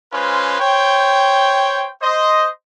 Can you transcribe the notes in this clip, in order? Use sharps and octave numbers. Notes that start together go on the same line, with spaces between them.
G#3 C#4 F4 B4 C5
C5 C#5 G5
C5 D#5